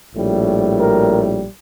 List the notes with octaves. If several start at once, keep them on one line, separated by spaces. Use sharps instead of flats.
A#1 A2 G3
A#4